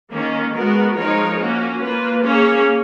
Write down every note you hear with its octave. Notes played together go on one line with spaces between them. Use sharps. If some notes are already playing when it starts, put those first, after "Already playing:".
D#3 A#3 C#4
G#3 B3 F#4 A#4
F3 G#3 D#4 A#4 C#5
A#3 C#4 F#4
A#3 F4 B4
A#3 C#4 G#4 C#5